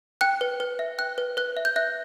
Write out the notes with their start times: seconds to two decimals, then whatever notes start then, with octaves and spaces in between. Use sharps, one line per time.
0.21 G5 F#6
0.41 B4
0.60 B4
0.79 E5
0.98 G5 F#6
1.18 B4
1.37 B4 F#6
1.57 E5
1.65 G6
1.76 E5 F#6